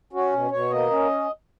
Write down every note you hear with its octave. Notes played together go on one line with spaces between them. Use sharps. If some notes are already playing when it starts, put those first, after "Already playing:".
C#4 F#4
B2
B2 C#5
A#3 D#5
C#4